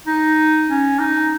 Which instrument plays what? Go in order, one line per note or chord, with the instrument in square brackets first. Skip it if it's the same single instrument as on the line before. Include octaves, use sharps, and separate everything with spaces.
[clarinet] D#4
C#4
D#4